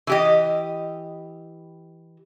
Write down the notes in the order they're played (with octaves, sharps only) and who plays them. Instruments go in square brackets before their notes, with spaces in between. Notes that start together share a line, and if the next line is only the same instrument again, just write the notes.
[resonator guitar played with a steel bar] E3 G4 D#5